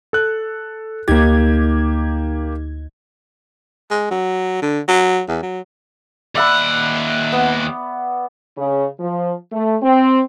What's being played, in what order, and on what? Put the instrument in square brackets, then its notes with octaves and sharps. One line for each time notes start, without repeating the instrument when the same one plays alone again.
[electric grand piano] A4 F#6
[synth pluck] D2 D#4 G#6 [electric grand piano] A#3 G4
[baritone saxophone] G#3
F#3
D3
F#3
E2
F#3
[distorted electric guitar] D#2 F#5 [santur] D5 E5 B5
[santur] B3
[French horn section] C#3
F3
A3
C4